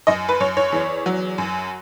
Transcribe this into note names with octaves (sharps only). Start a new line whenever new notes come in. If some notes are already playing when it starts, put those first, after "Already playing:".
F#2 D#5
B4
F#2 C#5
C#5
E2
F#3
F#2